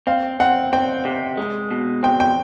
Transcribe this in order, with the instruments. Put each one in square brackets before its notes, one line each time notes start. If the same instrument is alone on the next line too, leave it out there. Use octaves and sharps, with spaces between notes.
[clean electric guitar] C4 [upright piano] F5
[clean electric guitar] C4 [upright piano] F#5
[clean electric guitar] C4 [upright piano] G5
[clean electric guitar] C3
G#3
B2
[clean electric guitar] C4 [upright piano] G5
[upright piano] G5